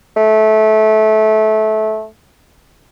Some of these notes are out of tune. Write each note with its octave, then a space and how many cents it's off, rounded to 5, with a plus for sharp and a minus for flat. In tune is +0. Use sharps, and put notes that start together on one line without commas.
A3 -20